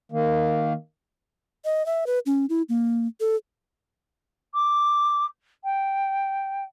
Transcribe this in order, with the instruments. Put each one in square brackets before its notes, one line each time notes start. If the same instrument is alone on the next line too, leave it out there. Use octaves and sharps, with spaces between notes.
[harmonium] D#3 A#3
[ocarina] D#5
E5
B4
C#4
E4
A#3
A4
[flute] D6
G5